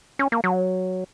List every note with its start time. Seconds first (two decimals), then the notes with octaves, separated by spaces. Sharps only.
0.19 C#4
0.32 A#3
0.44 F#3